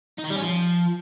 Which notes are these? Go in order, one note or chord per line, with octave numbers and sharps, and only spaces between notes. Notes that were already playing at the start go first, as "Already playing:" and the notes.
D#4
D#3
G3
C#4
F3